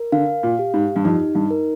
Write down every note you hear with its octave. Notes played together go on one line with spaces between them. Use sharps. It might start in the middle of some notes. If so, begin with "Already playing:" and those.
Already playing: A#4
D3 F5
A#2
G4
G#2
G2
F2 D#4
G2
A#4